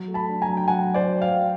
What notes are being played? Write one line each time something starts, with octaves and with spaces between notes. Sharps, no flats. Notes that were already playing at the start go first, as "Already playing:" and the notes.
Already playing: F#3
A3
A5 B5
D4
G#5 A#5
F#3
G5
F#3 F#5 G#5
F#3
C5 D5
F#3
F5 G5
F#3